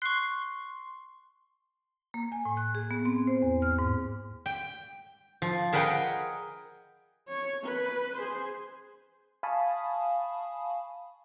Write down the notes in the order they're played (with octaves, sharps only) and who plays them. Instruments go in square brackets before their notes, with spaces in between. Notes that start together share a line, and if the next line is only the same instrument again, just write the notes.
[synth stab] C6 [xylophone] C#6 F#6
[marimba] A#3
G#5
A2
F#6
G#4
B3
C4
C5
E2
F6
G#2
[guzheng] G5
F3
G#4 A#4 B4 D#5 F#5 G5
[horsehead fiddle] C#5
B4
G#4 C5
[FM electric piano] F5 G#5 A5 B5 C#6 D#6